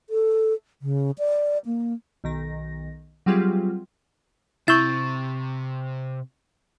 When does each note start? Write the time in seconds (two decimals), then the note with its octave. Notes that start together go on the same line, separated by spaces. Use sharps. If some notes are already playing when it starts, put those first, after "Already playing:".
0.10 A4
0.82 C#3
1.18 D5
1.66 A#3
2.24 B1 D#3 A#6
3.26 F#3 G3 C4 F4 G4 G#4
4.68 C3 E4 C#6 E6 G6 A6